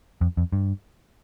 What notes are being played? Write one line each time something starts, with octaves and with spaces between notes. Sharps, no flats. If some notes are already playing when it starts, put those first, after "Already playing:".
F2
F2
G2